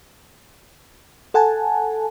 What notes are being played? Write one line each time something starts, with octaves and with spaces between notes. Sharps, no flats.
A4 F#5 G#5 A5